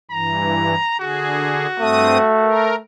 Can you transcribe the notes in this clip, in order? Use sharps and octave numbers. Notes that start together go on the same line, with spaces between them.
G2 E3 A#5
D3 F#4 G#4
G2 A3 C4 D#6
A#4